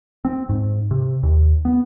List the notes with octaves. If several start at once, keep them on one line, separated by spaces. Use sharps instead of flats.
C4
G#2
C3
D#2
B3